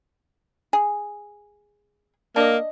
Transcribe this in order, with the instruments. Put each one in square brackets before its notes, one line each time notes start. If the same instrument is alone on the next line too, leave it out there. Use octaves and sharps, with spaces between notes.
[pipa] G#4
[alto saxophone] A#3 [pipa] D4 D#5